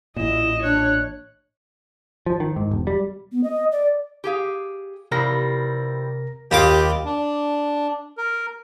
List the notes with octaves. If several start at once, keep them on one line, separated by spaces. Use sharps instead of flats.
A1 A#2 E4 D#5 E7
D4 C#5 F#6
F3
D#3
G#2
E1
G3
B3
D#5
D5
G4 G#4 F5
C3 E3 F3 G3 A#4 A#6
D#2 G3 F4 G4 G#4 D#5 D6
D4
A#4